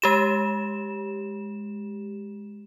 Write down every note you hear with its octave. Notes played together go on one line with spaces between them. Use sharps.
G#3 G4 E7